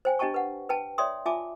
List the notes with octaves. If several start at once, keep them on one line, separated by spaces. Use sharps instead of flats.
C5 G5 G#5
D4 G4 D#5 G5 A5 C#6
B4 F#5
B4 G5 A5
C#5 D5 E5 G5 C6 D#6
F4 E5 G#5 A5 D6